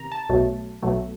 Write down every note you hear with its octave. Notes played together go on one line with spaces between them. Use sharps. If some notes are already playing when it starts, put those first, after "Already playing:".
Already playing: C3 D#3 A#5
A5
B1 B2 F#3 A3
B1 B2 F#3 A3